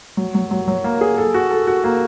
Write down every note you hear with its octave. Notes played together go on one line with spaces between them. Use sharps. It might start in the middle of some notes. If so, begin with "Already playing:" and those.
F#3
F#3
F#3
F#3
A#3
G#4
A4
F#4
A4
F#4
A#3